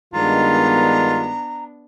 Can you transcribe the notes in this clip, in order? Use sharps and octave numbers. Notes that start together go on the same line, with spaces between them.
G2 D#3 G#3 B3 D4 F4 A#5